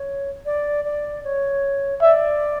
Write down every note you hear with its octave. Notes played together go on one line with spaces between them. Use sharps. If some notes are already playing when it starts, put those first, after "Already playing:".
Already playing: C#5
D5
D5
C#5
D5 E5